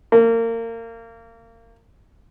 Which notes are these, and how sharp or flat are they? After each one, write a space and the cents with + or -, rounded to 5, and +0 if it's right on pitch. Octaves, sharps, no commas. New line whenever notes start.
A#3 -30